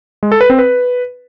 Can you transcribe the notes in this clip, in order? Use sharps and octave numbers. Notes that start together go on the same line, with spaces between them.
G#3
A4
B4
C4
B4